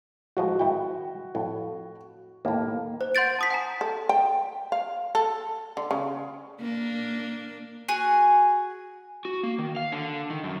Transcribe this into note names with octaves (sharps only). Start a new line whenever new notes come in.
A2 F3 G#3 F#4
G#1 E4 G5
F2 A2
D#2 A2 A#3
C5
F#5 C6 G6 A6 D7
A5 D#6 B6
F#5 G#5 A#5
A4
G5
F5
A4
D3
C#3
A#3 D4
F#4 G#4 G#5
F#4
A#3
D#3
F5
D3
D#3
F#2